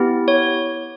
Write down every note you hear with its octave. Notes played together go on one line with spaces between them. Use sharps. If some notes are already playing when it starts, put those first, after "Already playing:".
Already playing: B3 E4 G4
C#5